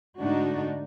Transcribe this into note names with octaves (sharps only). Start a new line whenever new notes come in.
G#2 D3 A3 D4 D#4 F#4